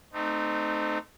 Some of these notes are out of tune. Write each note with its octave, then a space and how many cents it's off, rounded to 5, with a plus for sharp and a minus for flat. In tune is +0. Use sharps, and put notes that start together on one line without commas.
A3 +0 C4 -25 D#4 -25